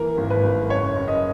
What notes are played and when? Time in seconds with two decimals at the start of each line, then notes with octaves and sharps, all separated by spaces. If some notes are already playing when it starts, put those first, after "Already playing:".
Already playing: E3 A#3 A#4
0.18 G#1
0.30 B4
0.44 G#1
0.69 F#1 C#5
0.96 F#1
1.08 D#5